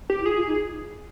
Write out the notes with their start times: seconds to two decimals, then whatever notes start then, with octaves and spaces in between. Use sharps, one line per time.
0.10 G4
0.21 E4
0.25 F4 G#4
0.36 F4
0.47 D#4